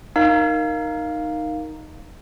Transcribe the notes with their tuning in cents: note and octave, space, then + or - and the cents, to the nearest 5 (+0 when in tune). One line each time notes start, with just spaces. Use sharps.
D#4 -5 A#4 +0 F5 +0